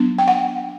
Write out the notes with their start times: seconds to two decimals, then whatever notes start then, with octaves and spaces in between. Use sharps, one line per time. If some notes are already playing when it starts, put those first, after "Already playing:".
Already playing: F#3 B3 D4
0.18 G5
0.28 F#5